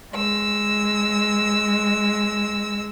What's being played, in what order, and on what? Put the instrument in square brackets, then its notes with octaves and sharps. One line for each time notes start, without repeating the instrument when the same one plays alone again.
[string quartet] G#3 E6